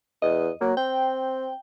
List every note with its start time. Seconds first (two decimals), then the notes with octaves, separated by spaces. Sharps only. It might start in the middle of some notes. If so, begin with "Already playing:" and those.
0.22 E2 D#5
0.61 F#3 A#3
0.77 C4 G5